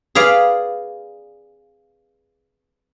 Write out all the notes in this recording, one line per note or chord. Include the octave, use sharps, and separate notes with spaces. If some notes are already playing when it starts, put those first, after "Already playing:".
G#4 B4 D5 F5